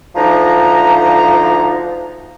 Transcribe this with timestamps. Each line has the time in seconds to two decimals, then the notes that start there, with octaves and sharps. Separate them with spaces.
0.15 D2 F3 D#4 A#5